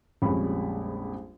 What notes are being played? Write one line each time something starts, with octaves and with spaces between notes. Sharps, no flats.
A#1 F2 G3 G#3 C#4 B5